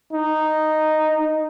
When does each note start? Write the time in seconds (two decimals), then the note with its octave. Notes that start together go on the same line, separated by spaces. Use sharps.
0.13 D#4